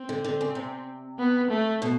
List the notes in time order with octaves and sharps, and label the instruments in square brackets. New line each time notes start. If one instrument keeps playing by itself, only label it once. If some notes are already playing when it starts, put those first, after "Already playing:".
Already playing: [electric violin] C4
[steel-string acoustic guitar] D3
D3
C#3
C3
[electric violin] B3
A3
[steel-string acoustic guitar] B2